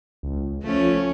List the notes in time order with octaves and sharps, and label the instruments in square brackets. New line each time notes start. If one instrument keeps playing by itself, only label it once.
[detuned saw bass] C#2
[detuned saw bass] F3 [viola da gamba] A3 C#4